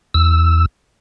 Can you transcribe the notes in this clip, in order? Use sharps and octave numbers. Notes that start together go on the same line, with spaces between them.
E2 E6